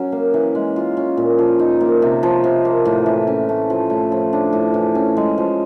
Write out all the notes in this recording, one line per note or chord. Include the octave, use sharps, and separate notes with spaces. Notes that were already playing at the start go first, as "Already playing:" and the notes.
Already playing: F#3 C#4
A#3
E3
G#3
F4
C#4
A#2
F3
D#4
A#3
C3
F3
C3
A#3
A2
E3
C#4
A3
F3
A3
F3
D4
A2
E3
C#4
G#3
F3